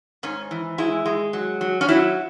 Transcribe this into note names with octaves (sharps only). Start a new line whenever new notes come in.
G#2 C#4
E3
G#3 E4
G#3
F#3
F#3
C#4
F#3 E4